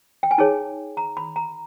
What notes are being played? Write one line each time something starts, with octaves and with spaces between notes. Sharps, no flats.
G5
G#5
D#4 G#4 C#5 A5
A#5
B5
A#5